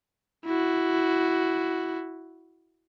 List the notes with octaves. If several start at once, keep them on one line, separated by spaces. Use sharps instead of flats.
E4 F#4